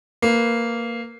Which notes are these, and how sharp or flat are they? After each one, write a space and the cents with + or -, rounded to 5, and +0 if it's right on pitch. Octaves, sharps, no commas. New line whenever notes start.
A#3 -10 B4 +0